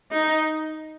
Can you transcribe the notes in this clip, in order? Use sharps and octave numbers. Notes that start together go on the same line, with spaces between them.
D#4